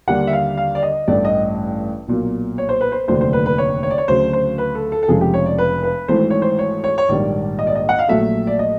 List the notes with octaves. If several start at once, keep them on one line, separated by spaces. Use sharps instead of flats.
D#2 D3 G3 A#3 F#5
E5
F5
F5
D5
D#5
A1 G2 E3 A3 D5
D#5
B1 A#2 F#3 A#3
C#5
C5
B4
C5
F1 D#2 D3 F#3 A3 C5
C5
B4
B4
C#5
C#5
D5
C#5
D2 C#3 F#3 C5
C5
B4
A4
A4
A4
F1 F2 C#3 F3 G#3 G#4
G4
C#5
D5
B4
B4
G#1 G#2 E3 A3 C5
C#5
C5
C#5
C#5
C#5
A#1 G#2 D#3 G3 A#3 D5
D#5
D5
D#5
F#5
F5
A#1 A#2 F#3 A3 E5
D5
D#5